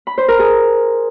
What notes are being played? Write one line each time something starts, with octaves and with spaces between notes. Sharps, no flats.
B5
C5
A#4
G#4